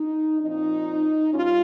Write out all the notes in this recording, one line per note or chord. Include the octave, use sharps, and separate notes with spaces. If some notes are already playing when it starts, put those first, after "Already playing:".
Already playing: D#4
A#2 F3 C4 D#4
G2 G3 C#4 F4